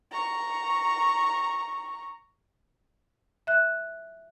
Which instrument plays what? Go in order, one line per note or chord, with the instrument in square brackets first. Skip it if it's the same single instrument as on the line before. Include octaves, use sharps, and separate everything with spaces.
[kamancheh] A#5 C#6
[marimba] E5 F#6